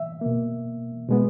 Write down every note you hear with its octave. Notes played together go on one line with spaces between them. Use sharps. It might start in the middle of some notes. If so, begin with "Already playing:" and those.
Already playing: E5
B2 A#3
B2 G#3 B3